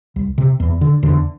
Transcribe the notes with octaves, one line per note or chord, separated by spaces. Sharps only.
C2
C3
E2
D3
E2 D3